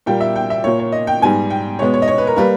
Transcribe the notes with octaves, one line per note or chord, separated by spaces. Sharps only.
A#2 G3 A#3 G5
E5
G5
E5
A#2 A#3 C#5
C#5
D#5
G5
G#2 G3 B3 G#5
G5
B2 G#3 B3 C#5
C#5
D#5
C#5
B4
A#4
G3 A#3 B4